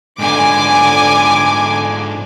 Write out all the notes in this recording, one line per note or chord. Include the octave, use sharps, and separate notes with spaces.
G#2 D3 B3 G#5 D6